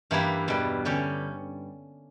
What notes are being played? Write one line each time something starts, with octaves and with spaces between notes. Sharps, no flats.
G2 E3 A#3 E4 G4
E2 B2 G3
D3 G3 C#4 G4